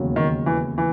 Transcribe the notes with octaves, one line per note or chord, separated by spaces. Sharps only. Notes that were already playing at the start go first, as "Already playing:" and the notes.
Already playing: E1 D#2 C#3 F#3
D#3
E3
E3